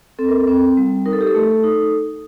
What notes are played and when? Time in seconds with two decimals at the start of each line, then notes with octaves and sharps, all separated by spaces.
0.19 C4 A4
0.29 A#4
0.40 A4
0.48 C4
0.77 G3
1.06 D#4 A#4
1.13 A4
1.21 G4
1.27 A4
1.35 A3
1.64 D#4